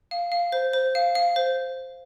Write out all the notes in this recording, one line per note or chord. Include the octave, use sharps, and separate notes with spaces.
F5
F5
C5
C5
F5
F5
C5